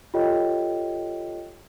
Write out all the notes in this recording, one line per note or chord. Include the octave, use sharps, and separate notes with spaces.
F4 G4 A4 C#5 D#5 G5